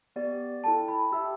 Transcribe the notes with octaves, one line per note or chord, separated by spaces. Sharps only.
B3 G4 D5
E4 A4 G5 A5
B5
G4 E5 G5 E6